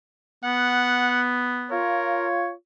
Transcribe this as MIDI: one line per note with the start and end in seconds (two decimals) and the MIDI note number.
0.44 1.79 59
0.44 1.22 78
1.71 2.51 65
1.71 2.28 70
1.71 2.51 73